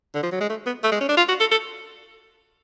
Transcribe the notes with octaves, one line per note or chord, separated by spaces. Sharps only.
D3
F3
F#3
G#3
A3
B3
A3
G#3
C#4
D4
F4
F#4
A4
A4